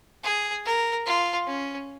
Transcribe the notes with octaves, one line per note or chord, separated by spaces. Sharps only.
G#4
A#4
F4
C#4